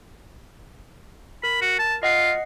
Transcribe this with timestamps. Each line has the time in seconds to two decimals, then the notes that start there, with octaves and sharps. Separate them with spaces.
1.43 A#4 B5
1.62 F#4
1.79 A5
2.03 F4 D#5 F#5 C7